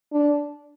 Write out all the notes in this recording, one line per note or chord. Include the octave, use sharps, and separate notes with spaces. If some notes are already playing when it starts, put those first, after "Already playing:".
D4